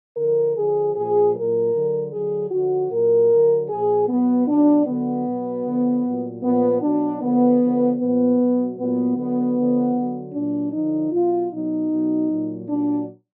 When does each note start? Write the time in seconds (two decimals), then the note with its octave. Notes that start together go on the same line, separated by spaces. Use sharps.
0.16 D3 F3 A#4
0.56 D3 F3 G#4
0.95 A#2 F3 G#4
1.34 A#2 F#3 A#4
1.73 D3 F#3
2.12 D3 F#3 G#4
2.51 D3 F3 F#4
2.91 A#2 F#3 A#4
3.29 D3 F#3
3.69 A#2 F3 G#4
4.08 B2 F#3 B3
4.48 B2 F#3 D4
4.86 D3 F#3 B3
5.26 B2 F#3
5.65 D3 F3
6.04 A#2 F#3
6.43 A#2 F3 B3
6.82 B2 F#3 D4
7.21 D3 F3 B3
7.60 D3 F3
7.99 A#2 F3 B3
8.38 B2 F#3
8.78 A#2 F#3 B3
9.17 D3 F#3 B3
9.56 D3 F3
9.95 D3 F#3
10.33 A#2 F#3 D4
10.73 D3 F3 D#4
11.12 B2 F#3 F4
11.51 B2 F#3 D#4
11.90 B2 F#3
12.30 A#2 F#3
12.68 A#2 F#3 D4